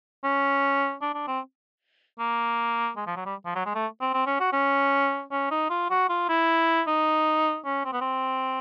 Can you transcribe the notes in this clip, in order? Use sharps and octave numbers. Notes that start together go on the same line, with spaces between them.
C#4
D4
D4
C4
A#3
G#3
F3
F#3
G3
F3
F#3
G#3
A3
C4
C4
C#4
F#4
C#4
C#4
D#4
F4
F#4
F4
E4
D#4
C#4
C4
B3
C4